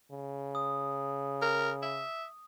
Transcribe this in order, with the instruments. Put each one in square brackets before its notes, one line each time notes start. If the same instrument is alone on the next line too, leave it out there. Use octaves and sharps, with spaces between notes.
[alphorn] C#3
[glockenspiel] D#6
[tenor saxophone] A#4
E5